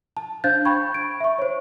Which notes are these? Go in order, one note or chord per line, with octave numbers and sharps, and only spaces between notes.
A5
D4 C5 F5 F#6 G6 A6
G5 B5 C#6 G#6
D7
E5 C#6
C5 C#5